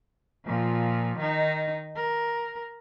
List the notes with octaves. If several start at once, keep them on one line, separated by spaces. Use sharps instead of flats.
A#2 F3
D#3 D#4
A#4